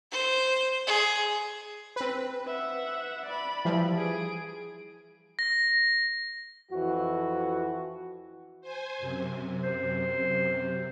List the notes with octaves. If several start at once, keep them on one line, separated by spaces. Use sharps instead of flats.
C5
G#4
C4 B4
E5 F#5
D5 B5
E3 F3 G3
G#4 D7
A#6
F2 E3 F#4
C5 G#5
F#2 C3
C5